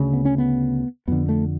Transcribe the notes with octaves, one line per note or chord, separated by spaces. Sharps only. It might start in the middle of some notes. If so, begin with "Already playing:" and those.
Already playing: D2 C#3
B3
C#4
B3
F2 D3 B3
A3